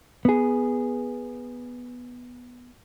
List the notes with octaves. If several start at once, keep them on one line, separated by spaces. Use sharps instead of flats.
B3 G#4